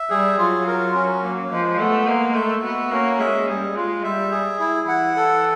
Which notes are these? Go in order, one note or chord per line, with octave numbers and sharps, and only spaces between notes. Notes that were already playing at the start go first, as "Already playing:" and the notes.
Already playing: E5
G3 G#4
F#3 F4
A#4
C#4
A#3
F3 G#3
A3 B3
G#3 A#3
A3 E5
B3 F#4
A#3 C#4
G#3 E5
G3 G#4
G#3 F4
G3 E5
G#4
E4
E3 F#5
A4